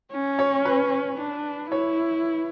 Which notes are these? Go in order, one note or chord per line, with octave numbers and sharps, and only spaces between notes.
C#4
C#5
B4
D4
E4 C#5